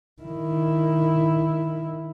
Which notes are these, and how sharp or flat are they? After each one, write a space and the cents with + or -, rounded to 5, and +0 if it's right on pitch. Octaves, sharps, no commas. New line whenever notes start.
D#3 +0 E4 +0